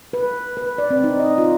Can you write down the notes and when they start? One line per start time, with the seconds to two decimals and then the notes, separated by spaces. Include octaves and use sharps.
0.13 B4
0.57 B4
0.78 D5
0.90 C4
1.04 D#4
1.20 D#5
1.38 F4